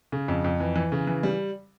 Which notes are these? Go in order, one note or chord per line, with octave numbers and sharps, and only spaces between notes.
C#3
F2
F2
E3
E3
C#3
E3
G3